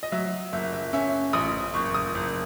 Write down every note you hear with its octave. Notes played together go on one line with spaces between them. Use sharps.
D#5
F#3 E5
F#1 E5
E5
C#4 E5
A1 D#6
F#1 C#6
D#6
F#1